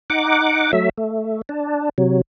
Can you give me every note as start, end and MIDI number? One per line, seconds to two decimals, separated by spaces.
0.10 0.72 63
0.10 0.72 78
0.10 0.72 86
0.73 0.89 54
0.73 0.89 57
0.73 0.89 76
0.97 1.41 57
1.49 1.89 62
1.98 2.21 48
1.98 2.21 54